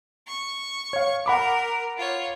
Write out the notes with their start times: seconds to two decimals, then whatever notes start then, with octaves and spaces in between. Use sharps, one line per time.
0.27 C#6
0.93 C#5 F5
1.26 A#4 F#5 B5 D6
1.97 F4 C#5